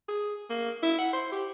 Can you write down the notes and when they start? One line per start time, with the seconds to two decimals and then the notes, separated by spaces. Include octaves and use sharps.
0.08 G#4
0.49 A#3
0.82 E4
0.98 F#5
1.13 C5
1.32 G4